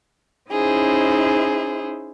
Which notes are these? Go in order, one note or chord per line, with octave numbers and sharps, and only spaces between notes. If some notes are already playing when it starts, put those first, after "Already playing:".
C#4 D#4 E4 G#4 C5